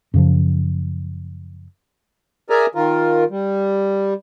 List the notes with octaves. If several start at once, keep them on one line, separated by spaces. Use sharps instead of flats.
F#2 C#3 F3
G#4 A#4 D5 E5 G#5 A#5
D#3 F4 A#4
G3